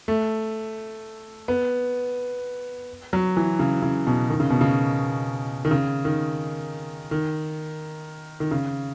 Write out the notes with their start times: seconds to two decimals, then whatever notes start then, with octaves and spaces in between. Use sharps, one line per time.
0.08 A3
1.48 B3
3.13 F#3
3.37 E3
3.59 C#3
3.82 C#3
4.07 B2
4.29 D#3
4.40 C#3
4.50 B2
4.61 C#3
5.65 D#3
5.71 C#3
6.05 D#3
7.11 D#3
8.40 D#3
8.51 C#3